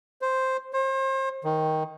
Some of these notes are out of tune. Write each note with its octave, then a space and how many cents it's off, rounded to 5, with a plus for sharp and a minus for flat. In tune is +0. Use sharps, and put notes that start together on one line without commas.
C5 +0
C5 +35
D#3 +10